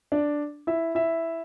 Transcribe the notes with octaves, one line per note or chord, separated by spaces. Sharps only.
D4 D5
E4 E5
E4 E5